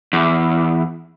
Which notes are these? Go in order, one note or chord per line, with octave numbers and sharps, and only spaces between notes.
E2